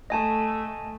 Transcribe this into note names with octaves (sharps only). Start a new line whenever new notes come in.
A3 D#5 G#5 A5